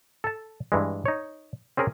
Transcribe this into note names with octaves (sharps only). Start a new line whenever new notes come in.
A4 A5
G2 E3 G#3
D#4 C#5
C4 C#4 G#4 A#4